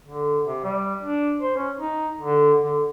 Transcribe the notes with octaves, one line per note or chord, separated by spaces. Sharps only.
D3
C3
G3
D4
C5
C#4
D#4
D3
D3